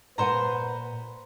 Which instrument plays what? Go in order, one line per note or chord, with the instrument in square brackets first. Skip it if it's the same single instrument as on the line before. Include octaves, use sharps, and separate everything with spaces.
[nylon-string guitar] A#2 F#5 G#5 [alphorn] B4 [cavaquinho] C5 A#5